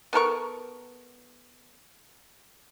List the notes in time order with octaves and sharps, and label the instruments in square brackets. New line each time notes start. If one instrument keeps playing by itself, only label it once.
[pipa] B3 A4 A#4 C#6